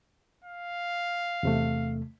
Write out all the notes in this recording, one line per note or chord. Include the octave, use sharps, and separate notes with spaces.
F5
E2 C3 A3